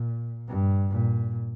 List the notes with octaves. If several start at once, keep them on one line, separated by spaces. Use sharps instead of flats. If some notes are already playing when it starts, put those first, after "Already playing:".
Already playing: A#2
G2
A#2